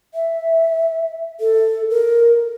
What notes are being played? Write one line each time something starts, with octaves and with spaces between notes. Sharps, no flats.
E5
A4
A#4